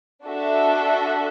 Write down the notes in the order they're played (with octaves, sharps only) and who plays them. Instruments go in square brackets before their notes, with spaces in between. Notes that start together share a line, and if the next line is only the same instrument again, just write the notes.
[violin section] D4 F#4 A4 E5